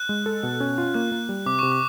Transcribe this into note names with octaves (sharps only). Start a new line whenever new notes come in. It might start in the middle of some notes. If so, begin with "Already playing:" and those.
Already playing: F#6
G#3
A4
B2
C#4
F4
A#3 F#6
A#3
G3
C3 D6
C3 C#6
D6